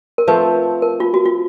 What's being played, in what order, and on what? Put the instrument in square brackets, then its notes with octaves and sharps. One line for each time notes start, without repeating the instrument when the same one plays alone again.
[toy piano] A#4
[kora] F3 A3 C4 [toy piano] B4
[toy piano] A#4
F4
F#4
F4